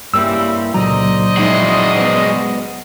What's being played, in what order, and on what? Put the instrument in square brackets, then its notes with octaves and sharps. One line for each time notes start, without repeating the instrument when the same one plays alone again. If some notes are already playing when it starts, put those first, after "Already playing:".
[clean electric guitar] G2 A#3 E4 [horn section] C#3 G3 C4 [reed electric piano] E6
[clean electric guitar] C#2 D3 A#5 [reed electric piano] A#2 F#3 [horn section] C5 D5 D#5
[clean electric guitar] F3 D#4 E4 [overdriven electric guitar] G#3 F#4
[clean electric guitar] B3